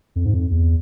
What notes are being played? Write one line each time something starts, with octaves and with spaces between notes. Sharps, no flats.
F2
G#2
F2
E2